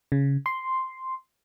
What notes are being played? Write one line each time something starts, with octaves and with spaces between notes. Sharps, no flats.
C#3
C6